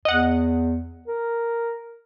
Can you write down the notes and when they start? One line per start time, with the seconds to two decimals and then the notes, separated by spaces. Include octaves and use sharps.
0.05 E2 D#5 F#5
1.08 A#4